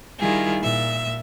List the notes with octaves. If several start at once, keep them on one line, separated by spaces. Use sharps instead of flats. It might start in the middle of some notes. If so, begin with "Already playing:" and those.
D#3 G3 E4 F4 G#4
A#2 E5